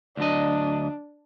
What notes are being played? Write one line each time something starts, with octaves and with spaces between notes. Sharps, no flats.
D2 F#3 D4 D#5